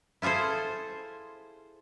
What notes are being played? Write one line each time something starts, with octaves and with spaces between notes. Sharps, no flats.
E4 F4 G#4 A4 C5